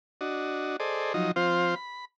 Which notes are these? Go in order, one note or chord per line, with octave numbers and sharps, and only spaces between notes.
D4 F#4 D#5
G#4 A4 C5 D5 D#5
F3 F#3 D#4 D#5
F3 C4 F4 C5 F5
B5